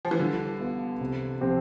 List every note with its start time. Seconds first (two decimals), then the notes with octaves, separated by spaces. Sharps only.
0.05 F3
0.11 E3
0.19 D3 G3
0.60 B3 F4
1.00 C3
1.41 F3 C4 G4